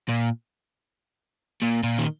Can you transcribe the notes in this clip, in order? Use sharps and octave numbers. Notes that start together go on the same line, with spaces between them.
A#2
A#2
A#2
D#3